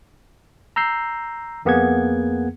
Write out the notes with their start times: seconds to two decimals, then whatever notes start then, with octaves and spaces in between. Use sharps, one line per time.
0.76 A#5 E6 G6 C7
1.65 F2 A#3 B3 G#4 F#5 G#6